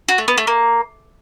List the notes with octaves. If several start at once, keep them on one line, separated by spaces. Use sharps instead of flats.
F#4
A3
B3
A3
A#3